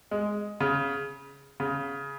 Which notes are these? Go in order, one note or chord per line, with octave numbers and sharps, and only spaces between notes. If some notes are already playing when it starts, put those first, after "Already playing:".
G#3
C#3
C#3